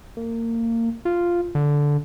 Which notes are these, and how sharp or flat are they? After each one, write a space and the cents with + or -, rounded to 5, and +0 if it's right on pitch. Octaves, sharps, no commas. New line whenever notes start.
A#3 -25
F4 -5
D3 -10